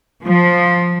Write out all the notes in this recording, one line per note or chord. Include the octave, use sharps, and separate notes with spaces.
F3